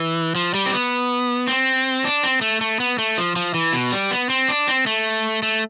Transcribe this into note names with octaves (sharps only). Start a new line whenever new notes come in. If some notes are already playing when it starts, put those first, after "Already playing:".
Already playing: E3
F3
G3
C4
B3
C4
D4
C4
A3
A3
B3
A3
F3
F3
E3
B2
G3
B3
C4
D4
C4
A3
A3